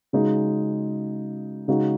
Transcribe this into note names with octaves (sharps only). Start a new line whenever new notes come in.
C#3 G#3 D#4 F#4
C#3 G#3 D#4 F#4